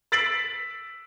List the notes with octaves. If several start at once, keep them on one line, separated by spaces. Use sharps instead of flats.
E6 A6 B6 C7 D7 F#7